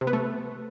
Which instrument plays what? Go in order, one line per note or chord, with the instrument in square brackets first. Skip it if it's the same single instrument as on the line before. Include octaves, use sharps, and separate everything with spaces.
[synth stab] C3
B3
A3